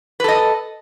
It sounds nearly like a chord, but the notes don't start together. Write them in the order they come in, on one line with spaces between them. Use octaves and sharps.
B4 A4 D#5